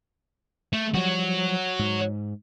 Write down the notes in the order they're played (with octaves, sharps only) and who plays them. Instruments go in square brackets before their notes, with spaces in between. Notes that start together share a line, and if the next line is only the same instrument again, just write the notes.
[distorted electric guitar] A3
[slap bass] F3 G3 [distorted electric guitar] F#4 C#5
[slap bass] G#2